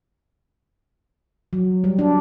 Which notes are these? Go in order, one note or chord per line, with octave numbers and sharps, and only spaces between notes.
F#3
G3
D4